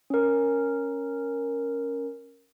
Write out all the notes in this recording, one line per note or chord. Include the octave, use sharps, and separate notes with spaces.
C#4 A#4